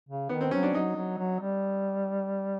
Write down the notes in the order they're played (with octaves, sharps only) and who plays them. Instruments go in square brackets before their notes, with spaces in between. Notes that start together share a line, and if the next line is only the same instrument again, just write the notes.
[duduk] C#3
[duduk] D#3 [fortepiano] B3
[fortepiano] C4
[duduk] F#3 [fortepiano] C#4
[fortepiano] D4
[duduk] F#3 [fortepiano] D#4
[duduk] F#3
F#3
G3